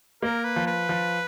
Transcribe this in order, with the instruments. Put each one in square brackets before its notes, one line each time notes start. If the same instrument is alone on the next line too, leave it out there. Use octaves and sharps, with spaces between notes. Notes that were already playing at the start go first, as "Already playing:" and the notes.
[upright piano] A#3 [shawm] A#4
[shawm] B4
[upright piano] F3
[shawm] B4
[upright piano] F3